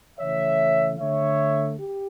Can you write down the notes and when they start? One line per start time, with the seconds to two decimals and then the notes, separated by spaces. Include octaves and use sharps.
0.19 C#3 E3 A3 C#5 E5
0.99 D3 A3 C#5 E5
1.78 G4